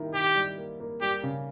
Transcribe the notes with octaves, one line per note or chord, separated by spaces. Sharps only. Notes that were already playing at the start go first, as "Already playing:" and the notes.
Already playing: D#3 G3 A#3 E4
D#3 G4
G3
A#3
A#3
G3 G4
C#3